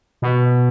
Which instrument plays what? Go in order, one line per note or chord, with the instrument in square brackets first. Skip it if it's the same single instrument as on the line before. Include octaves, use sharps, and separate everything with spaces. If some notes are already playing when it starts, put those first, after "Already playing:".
[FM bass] B2